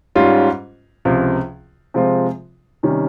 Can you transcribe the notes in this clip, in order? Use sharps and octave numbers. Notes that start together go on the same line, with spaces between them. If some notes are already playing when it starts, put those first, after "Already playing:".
G#2 G3 C#4 F4
C#2 C3 F3
C3 F3 G#3 C4 F4
C3 D#3 G3 C#4